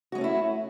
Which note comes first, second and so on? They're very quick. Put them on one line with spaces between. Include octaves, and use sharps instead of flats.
F#4 G#3 C#4 A3 E4